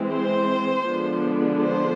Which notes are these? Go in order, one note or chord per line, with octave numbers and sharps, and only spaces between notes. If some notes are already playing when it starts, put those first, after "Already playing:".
Already playing: E3 G#3 C4
C5
D3 F3 G#3 B3 D4
C5